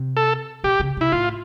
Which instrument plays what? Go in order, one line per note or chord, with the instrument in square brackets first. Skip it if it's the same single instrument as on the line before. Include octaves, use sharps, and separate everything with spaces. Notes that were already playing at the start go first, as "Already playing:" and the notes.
Already playing: [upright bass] C3
[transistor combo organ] A4
[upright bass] B2 [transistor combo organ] G4
[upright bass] C#3
[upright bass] C3 [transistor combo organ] E4
[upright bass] A2 [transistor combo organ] F4